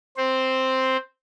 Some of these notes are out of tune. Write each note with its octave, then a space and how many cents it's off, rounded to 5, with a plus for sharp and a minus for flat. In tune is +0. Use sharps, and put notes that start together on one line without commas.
C4 +0 C5 +0